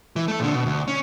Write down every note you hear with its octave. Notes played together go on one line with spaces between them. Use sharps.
E3
A3 A4
A#2 D3
B2
D2
C#4